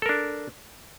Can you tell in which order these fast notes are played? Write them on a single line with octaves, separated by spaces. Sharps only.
A4 A#4 D4